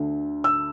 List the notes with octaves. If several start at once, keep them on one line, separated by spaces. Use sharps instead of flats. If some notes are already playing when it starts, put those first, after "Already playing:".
Already playing: D2 D3
E6